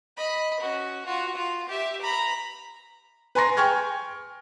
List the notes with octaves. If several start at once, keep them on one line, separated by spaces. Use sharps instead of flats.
D#5 B5
C#4 F#4
F4 F#4
F4
G4 E5
A#5 B5
B4 G#5 A#5 C6 A#6
G5 G#5 C#6 F6 G#6